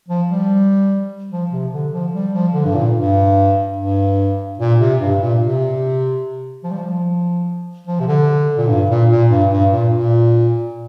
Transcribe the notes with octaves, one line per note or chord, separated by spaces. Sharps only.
F3
G3
F3
C3
D3
F3
G3
F3
D3
G2
A#2
G2
G2
A#2
C3
G2
A#2
C3
F3
G3
F3
F3
C3
D3
A#2
G2
A#2
A#2
G2
G2
A#2
A#2